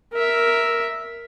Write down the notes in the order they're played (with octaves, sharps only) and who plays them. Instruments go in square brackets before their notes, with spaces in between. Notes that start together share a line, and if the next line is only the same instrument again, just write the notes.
[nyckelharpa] A#4 E5